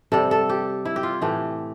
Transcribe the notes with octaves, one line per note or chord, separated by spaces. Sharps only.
C3 G3 A4
A4
G4
E4
G4
F4
A2 E3 A3 G4